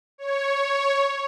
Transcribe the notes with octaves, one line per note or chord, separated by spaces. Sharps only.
C#5